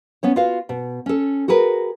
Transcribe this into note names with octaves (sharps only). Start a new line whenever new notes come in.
B3 C#4 C#5
F4 F#4 B4 F5
B2
C#4 A4
F#4 G#4 A#4 B4